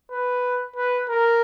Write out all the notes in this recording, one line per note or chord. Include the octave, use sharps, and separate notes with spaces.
B4
B4
A#4